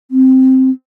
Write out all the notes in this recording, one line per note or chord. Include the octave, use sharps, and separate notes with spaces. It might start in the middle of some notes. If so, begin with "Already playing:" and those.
C4